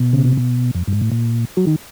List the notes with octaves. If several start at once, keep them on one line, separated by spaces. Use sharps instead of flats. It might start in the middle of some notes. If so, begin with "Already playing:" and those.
Already playing: B2
C#3
C3
B2
F2
G2
G#2
A2
A#2
F#3
D#3